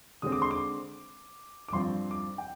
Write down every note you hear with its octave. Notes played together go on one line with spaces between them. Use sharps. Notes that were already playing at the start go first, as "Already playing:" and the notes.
D3 G#3 C4 D#6
D6
C6
D6
D6
G2 F3 C4 C6
D6
G5